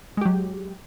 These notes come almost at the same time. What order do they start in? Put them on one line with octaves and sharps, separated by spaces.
G#3 G4 F#3